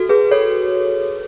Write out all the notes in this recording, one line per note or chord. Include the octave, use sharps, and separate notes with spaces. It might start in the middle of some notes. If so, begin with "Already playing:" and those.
Already playing: F#4 A4
G#4 B4
A4 C#5